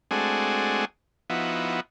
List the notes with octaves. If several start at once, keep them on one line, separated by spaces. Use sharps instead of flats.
G#3 A3 C4 D4 F#4 G#4
F3 B3 D#4 E4 F#4